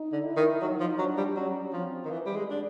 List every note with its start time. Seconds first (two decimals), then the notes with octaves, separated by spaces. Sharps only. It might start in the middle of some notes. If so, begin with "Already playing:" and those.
Already playing: D#4
0.12 D3
0.25 E4
0.37 D#3
0.62 F#3 D#4
0.80 F3
0.99 F#3 D4
1.18 G3
1.36 F#3 C#4
1.73 F3 C4
2.05 D#3
2.11 E3
2.26 G3
2.36 G#3
2.51 D4